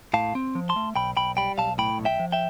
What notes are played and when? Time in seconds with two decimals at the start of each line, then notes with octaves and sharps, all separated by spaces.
0.14 A2 F5 A5
0.35 C4
0.55 F3
0.69 A5 C6
0.76 A3
0.96 B1 G5 B5
1.17 B1 G5 B5
1.37 G3 G5 B5
1.58 B1 F5 A5
1.78 A2 G5 B5
1.98 B1
2.05 E5 G5
2.20 F3
2.32 E5 G5